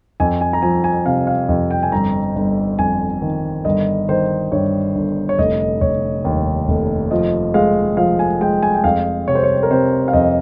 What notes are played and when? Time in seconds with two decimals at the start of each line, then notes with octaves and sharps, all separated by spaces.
0.20 F2 G#5
0.41 G#5
0.53 A#5
0.62 F3 G#5
0.84 G#5
1.06 C3 F5
1.27 F5
1.49 F2
1.71 G5
1.83 G#5
1.92 G1 A#5
2.36 G1
2.79 F2 G#5
3.22 D#3
3.65 G1 D#5
4.09 D#3 C5
4.52 G2 C#5
4.95 G1
5.29 C#5
5.39 F1 D#5
5.81 F1 C#5
6.25 D#2
6.68 F1
7.11 F3 D#5
7.54 G#3 F5
7.97 F3 F5
8.19 G#5
8.41 G#3 G5
8.63 G#5
8.75 G5
8.84 F2 F5
9.28 C3 C#5
9.35 C5
9.43 C#5
9.63 A#4
9.71 C3 C5
10.08 F5
10.13 F2 D#5